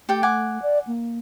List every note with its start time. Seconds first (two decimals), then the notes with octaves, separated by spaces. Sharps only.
0.09 A3 G4 A4 G5
0.23 F#5 G#5 D6
0.62 D5
0.87 A#3